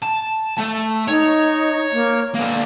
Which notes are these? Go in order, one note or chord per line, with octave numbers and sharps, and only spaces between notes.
A5
A3
D#4 C#5
A#3
D3 A#3 B3